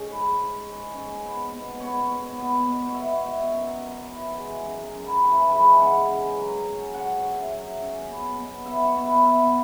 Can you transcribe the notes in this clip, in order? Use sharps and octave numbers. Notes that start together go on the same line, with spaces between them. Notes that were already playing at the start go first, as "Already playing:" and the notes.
Already playing: G#3 C#4 C#5
G#2 B4
G#2
G#3
C#4
B3
B2
B3 C#5
B2
B3
B2
C#5
B3 E5
B2
F#2
F#2
E3
G#3
F#2 G#5
G#5
F#2
B5
E3 G#5
E5
G#3 B5
G#5
C#3 F#5
C#3
F#3
C#4
C#3 F#5
C#5
C#3
E5
F#3
C#4
B3
B2
B3 E5
C#5
B2
B4
B3 E5